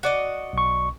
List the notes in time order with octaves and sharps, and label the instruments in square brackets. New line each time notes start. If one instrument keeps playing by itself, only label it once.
[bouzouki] F#4 D5 D#5
[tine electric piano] B1 C#6